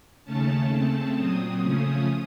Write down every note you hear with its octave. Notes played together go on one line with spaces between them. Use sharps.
D#2 C#3 A3 C#4 A5
C#3 A3 C4 A5
A#2 F#3 C4 D#6
C#3 F3 A3 C#4